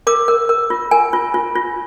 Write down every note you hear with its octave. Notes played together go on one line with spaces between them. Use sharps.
A#4 D6
A#4
A#4
F4
A#4 G#5
F4
F4
F4